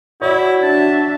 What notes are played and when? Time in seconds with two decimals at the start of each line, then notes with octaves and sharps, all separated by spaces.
0.22 E4 F#4 C#5 D5
0.63 D4 E5 A5